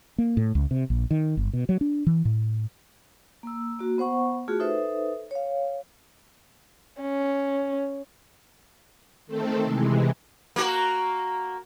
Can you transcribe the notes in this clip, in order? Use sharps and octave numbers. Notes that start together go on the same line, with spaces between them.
A#3
A2
C#2
C3
A#1
D#3
G1
B2
F#3
D4
E3
A2
A#3 E6
A#3 F#4
B3 C5 F#5 C#6
A3 F4 F#4 G#4
D#4 A4 B4 C5 E5
C#5 F5
C#4
D#3 A3 C4 A4
C3 E3 G#3
A#3 F#4 A#4